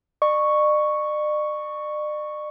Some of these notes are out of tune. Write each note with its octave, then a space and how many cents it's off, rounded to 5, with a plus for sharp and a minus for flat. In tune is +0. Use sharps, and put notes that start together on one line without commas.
D5 +45 C#6 +0